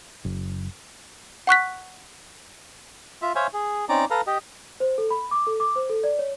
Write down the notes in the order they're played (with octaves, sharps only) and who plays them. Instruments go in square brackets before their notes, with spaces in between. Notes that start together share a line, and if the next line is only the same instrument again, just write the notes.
[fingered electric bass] F#1
[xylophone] F#5 C#6 F#6 B6
[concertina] F4 E5
C5 C#5 E5 F5 G#5
G#4
C4 C#4 D#4 D5 A#5 D6
A4 B4 F5 A#5
G4 D#5
[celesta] C5
A4
B5
D6
A4
D6
C5
A4
D5
C#5